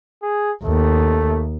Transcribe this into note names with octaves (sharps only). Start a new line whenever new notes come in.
G#4
D#2 A3